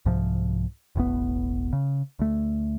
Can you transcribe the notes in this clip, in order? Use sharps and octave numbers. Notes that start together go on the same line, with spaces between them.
C2 G#2 C3 F3
E1 A1 A2 B3
C#3
D2 A3